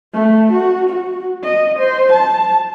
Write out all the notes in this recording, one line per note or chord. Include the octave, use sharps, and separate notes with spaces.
A3
F#4
F#4
D#5
C5
A5